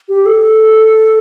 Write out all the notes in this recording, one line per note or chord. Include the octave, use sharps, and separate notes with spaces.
G4
A4